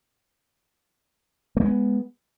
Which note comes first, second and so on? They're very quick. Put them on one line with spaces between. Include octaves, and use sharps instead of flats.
A3 G#3 B3